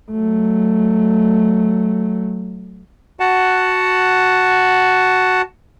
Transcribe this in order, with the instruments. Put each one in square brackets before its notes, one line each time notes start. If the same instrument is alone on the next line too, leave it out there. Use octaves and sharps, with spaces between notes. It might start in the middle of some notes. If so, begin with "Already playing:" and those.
[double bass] F#3 A3
[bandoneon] F#4 F#5 A5